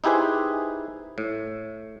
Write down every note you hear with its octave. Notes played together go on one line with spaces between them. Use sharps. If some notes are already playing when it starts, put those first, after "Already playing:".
D#4 E4 G4 G#4 B4 C5
A2